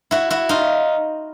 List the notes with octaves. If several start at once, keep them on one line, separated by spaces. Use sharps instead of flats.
E4 F#4
E4 F#4
D#4 F4